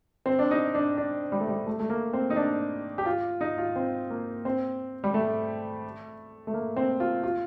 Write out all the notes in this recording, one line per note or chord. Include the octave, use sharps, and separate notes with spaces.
C4
D4
D#4
D4
D4
G3
A3
G3
A3
A3
A#3
C4
D#4
D4
G4
F4
D#4
F4
C4
A#3
C4
G3
A3
A3
A#3
C4
F4
F4